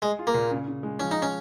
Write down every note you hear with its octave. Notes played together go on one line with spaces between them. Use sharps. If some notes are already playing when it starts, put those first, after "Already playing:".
G#3 G#4
F4
A#3
A#2
C#3
C#3
G#3
F3 C#4
D#4
C#4